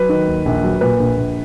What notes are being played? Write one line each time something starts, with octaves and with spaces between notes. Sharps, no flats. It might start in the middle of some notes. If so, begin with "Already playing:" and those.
Already playing: F#3 B4
D#3
D#2
A#1
F#3
A#2 B4
A#1
A#1